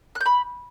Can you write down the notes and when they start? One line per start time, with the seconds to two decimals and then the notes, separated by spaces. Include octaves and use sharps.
0.15 F#6
0.21 G6
0.26 B5